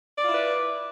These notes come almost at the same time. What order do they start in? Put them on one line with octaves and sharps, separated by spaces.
D5 F4 E4 B4